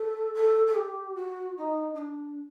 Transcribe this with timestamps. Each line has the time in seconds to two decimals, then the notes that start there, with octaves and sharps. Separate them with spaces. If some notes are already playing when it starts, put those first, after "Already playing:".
Already playing: A4
0.34 A4
0.67 A4
0.75 G4
1.16 F#4
1.58 D#4
1.94 D#4
1.98 D4